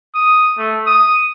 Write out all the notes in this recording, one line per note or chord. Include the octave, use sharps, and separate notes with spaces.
D#6
A3
D#6